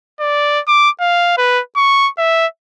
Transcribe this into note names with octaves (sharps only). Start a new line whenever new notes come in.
D5
D6
F5
B4
C#6
E5